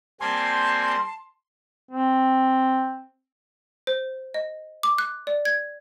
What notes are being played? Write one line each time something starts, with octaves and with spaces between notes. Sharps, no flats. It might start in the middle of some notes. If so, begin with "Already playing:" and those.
G3 A#3 C4 G#5 A5 C6
C4
C5
D#5
D6
F#6
D5
G#6